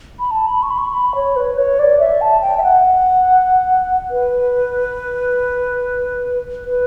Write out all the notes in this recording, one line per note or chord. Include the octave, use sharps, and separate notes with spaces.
B5
A5
B5
C#6
B5
C#6
B5
C#5
B4
C#5
D5
E5
A5
G5
E5
F#5
B4
B4